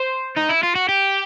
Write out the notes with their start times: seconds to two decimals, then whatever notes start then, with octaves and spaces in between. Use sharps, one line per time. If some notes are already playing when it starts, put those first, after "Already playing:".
Already playing: C5
0.37 D#4
0.50 E4
0.63 F4
0.76 F#4
0.89 G4